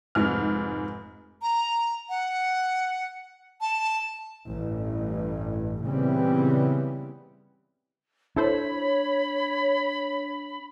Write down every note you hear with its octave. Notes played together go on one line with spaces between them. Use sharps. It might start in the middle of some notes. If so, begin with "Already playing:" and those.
F1 G#2 F6
A#5
F#5
A5
A1 G2
A#2 C#3 E3 G3 B3 C4
D4 E4 A4 C5 C#5 B5